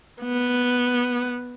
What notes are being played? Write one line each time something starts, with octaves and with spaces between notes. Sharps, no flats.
B3